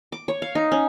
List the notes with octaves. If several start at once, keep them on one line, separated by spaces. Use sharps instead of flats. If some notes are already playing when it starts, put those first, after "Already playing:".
D6
C#5
F5
D#4
C#4